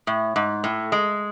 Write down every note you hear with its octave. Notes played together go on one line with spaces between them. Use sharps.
A2
G#2
A2
G#3